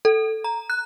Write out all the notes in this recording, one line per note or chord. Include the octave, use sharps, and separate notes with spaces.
A4
A#5
F#6